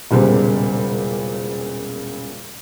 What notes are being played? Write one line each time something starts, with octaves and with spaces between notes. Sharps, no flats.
E1 A#2 C#3 G3 B3 C5